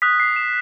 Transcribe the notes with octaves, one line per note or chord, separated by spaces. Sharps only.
D#6 F#6 B6
C7
E7